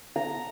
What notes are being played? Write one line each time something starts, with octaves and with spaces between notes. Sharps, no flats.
A#5